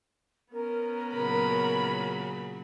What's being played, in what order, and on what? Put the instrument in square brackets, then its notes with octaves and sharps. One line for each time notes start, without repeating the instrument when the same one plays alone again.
[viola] B3 C#4 [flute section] A#4
[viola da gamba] A#2 C#3 F#3 [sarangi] B5